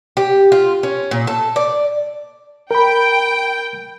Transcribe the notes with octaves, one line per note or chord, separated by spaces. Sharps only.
G4
F4
C#4
A#2
A4
D5
A#4 G5 B5